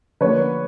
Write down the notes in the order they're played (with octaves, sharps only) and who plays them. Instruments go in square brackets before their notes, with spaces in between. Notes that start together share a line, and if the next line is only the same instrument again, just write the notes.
[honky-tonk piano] D3 F3 A#3 B4 C#5